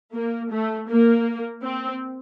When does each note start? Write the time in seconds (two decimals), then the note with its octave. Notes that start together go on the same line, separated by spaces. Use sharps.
0.14 A#3
0.51 A3
0.89 A#3
1.63 C4